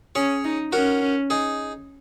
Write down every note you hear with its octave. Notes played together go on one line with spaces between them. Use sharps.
C#4 G#4 C#5
D#4
C#4 F#4 A#4
D#4 G#4